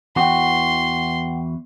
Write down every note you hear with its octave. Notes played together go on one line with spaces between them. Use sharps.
E2 E3 F#4 F#5 G5 C6